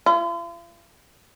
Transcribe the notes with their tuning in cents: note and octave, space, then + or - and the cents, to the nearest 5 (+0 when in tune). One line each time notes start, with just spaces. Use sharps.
F4 -45